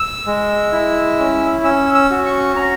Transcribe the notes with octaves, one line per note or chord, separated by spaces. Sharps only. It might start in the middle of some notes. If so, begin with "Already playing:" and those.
Already playing: E6
G#3
E4
C#4
C#4 E6
E6
F#4
C#6
C#4 A#5